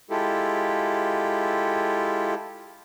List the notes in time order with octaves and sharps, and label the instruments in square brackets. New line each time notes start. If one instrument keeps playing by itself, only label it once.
[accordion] G#3 E4 F4 G4 A4